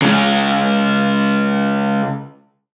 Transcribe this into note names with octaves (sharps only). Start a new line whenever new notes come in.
C#3 G#3